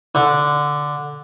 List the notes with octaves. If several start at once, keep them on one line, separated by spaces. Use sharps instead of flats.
D3